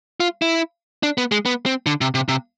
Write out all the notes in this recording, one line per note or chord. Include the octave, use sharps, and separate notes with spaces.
F4
E4
D4
B3
G#3
B3
C4
D3
C3
C3
C3